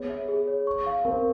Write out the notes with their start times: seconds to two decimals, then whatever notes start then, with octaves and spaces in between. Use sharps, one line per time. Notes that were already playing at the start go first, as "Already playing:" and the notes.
Already playing: B3 G#4 C#5
0.09 E5
0.28 G#4
0.47 C#5
0.67 C#6
0.86 F5
1.05 C4 A#4